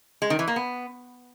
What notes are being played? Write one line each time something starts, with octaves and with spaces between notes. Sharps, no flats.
G#3
D#3
E3
A#3
B3